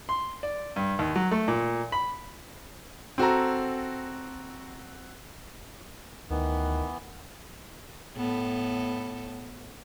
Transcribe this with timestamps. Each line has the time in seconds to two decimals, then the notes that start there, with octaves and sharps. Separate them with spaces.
0.09 C6
0.43 D5
0.76 G2
0.99 D#2
1.16 F#3
1.31 A3
1.48 A#2
1.92 B5
3.18 C4 F#4 A4 A#5
6.30 D2 D#3 E3 B3
8.17 A2 B3 A4